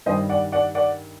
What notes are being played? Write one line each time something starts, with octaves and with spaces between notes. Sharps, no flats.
G2 D#3 G3 C5 D#5
D5 F#5
D5 F#5
D5 F#5